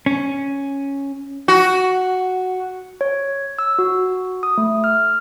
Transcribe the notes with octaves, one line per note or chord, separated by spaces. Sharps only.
C#4
F#4
C#5
E6
F#4
D#6
A3
F6